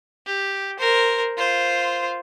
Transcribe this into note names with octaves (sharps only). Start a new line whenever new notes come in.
G4
A#4 C5
F4 C5